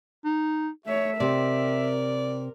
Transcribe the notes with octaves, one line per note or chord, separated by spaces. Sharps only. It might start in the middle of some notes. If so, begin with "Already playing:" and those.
D#4
A3 C#5 E5
C3 C4 A#4 D5